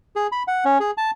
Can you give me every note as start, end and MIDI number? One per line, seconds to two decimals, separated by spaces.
0.16 0.27 68
0.32 0.43 83
0.48 0.64 78
0.65 0.78 61
0.80 0.91 68
0.97 1.11 81